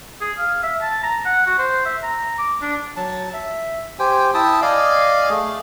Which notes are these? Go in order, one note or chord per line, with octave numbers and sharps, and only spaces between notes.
G#4
F5
E5
A5
A#5
F#5
F#4
C5
E5
A#5
D6
D4
F#3 A5
E5
G4 C5 G5 G#5
E4 G5 A5 D#6
D5 D#5 F5 G#5
A3 G#4